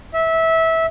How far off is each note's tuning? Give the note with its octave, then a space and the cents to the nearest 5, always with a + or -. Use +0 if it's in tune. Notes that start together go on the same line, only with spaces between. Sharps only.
E5 -20